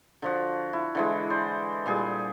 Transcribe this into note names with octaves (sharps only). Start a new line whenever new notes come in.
D3 F3 F#4
E4
D3 E3 G#3
C5 D5
A#2 G3 G#4